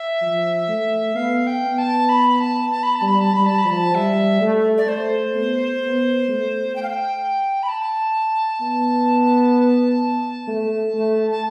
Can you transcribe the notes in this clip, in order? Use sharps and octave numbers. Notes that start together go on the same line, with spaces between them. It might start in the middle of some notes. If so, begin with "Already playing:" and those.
Already playing: E5
F3
A3
B3 F5
G5
B3
A5
B5
A5
A5
B5
A5
G3
B5
A5
G3 B5
A5
B5
F3
A5
G3 E5
A3
D5
A3 C5
B3
B3
A3
G5
F5
G5
B5
A5
B3
A3
A3
A5